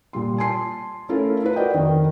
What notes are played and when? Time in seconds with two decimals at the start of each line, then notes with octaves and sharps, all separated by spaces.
0.13 A#2 G3 C6
0.38 G#5 A5 C6 C7
1.09 A3 C#4 E4 F4 A4 A#4
1.42 E4 A#4 B4
1.56 F#4 B4 D5 D#5 G5
1.72 F2 D#3 A#4